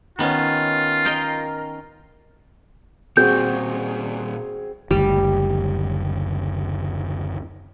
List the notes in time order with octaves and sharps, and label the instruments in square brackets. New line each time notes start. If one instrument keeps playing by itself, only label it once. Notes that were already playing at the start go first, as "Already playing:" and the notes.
[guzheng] D#3 B3 C#4 [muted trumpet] F4
[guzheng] A#4 D#5 G5
[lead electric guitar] A#2 G3 [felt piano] C4 G#4 [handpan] F#4 [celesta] G6
[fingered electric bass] F#1 D2 [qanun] G3